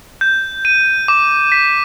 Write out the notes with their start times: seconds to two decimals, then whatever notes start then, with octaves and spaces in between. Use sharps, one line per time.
0.21 G6
0.65 D#7
1.08 D6
1.52 B6